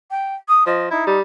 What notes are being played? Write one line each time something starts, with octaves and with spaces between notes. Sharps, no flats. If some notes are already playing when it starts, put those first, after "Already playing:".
G5
D#6
F3 D#5
D#4 E4
G3